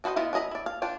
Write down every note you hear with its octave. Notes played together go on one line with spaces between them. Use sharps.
D4 F#4 B4 C5 D#5
B3 E4 F4 D#5
D4 E4 D#5 A#5 B5
E4 D5
F5
D4 F4 G5